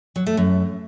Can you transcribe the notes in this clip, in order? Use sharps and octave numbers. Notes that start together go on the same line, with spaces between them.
F#3
A3
F#2